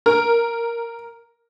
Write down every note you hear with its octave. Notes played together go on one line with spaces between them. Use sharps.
A#4